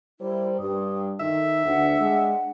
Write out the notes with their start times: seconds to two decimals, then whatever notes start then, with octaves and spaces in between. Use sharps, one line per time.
0.20 G3 E4 A#4 C5
0.59 G2 D#6
1.20 D#3 D#4 A4 E5
1.65 D2 D4 F#5
1.99 G#3